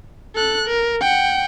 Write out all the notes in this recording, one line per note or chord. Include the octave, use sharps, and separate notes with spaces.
A4 F#6
A#4
F#5 G5